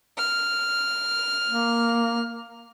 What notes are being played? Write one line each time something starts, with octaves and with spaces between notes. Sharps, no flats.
F6
A#3